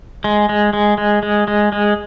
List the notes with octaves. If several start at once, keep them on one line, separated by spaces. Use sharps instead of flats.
G#3
G#3
G#3
G#3
G#3
G#3
G#3